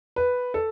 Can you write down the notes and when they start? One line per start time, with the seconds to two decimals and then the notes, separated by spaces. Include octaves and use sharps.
0.16 B4
0.54 A4